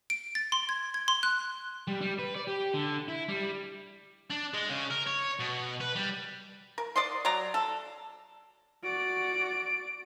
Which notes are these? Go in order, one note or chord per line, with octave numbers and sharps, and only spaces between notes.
D7
A6
C6
G#6
G#6
C6
F#6
G3
G3
B4
D5
G4
D3
E4
G3
D4
G#3
C#3
A#4
C#5
B2
B4
G3
A#4
D5 D#5 C6
F#3 D5 A#5
A4
F#4 D5 D7